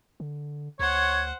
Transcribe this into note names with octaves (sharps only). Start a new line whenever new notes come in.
D3
D2 C5 C#5 F#5 G#6